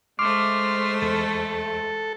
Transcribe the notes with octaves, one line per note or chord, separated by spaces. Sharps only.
G#3 A3 C5 C6 D6 F6
E2 A4